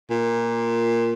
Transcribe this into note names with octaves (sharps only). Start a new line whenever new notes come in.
A#2